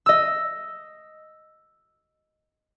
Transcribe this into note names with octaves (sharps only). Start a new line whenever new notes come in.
D#5 E6